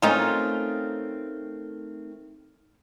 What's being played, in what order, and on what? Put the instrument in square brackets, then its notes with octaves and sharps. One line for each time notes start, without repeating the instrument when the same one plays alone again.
[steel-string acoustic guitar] D#3 A3 C4 [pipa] C#4 D#4 F4